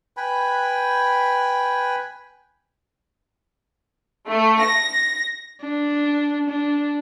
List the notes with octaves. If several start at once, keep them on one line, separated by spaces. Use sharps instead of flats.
B4 G5 G#5 B5
A3
A#6
D4
D4